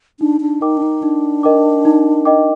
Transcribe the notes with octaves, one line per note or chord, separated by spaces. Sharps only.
D4 D#4
D4
D#4 A#4 D#5 G5 D6
D4
D#4
D4 D#4
A#4 D#5 G5 D6
D#4
A#4 D#5 G5 D6